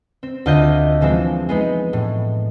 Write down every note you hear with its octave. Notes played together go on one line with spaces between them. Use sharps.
C4
D2 F4 D#5 G6 A#6
E3 F3 G#3 C4
G#3 B3 D#4
A2